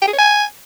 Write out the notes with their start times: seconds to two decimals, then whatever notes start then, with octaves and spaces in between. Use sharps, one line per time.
0.02 G5
0.08 G#4
0.13 C#5
0.19 G#5